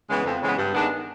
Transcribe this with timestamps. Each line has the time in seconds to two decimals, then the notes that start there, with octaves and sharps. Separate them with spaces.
0.09 C#3 E3 G#3 B3
0.26 F2
0.43 C#3 E3 G#3 B3
0.58 G2
0.74 D#3 G#3 B3 D4